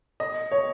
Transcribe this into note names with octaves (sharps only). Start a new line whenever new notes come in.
D#5
C#5